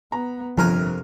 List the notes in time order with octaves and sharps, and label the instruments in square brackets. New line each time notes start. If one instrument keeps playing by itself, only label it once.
[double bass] B3 [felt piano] A#5
[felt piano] G1 A#5 [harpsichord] F2 A#4 G#5 [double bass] C3 [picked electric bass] F3